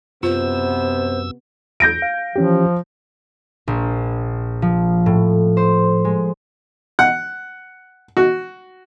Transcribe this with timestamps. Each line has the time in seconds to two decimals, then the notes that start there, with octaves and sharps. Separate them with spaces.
0.23 F#2 C3 B3 F4 C5 E6
1.80 E2 G6 A#6 D7
2.02 F5
2.36 E3 F3 C#4 G4
3.68 A#1
4.62 F3
5.06 A2
5.57 C5
6.05 G#3
6.99 F#5
8.17 F#4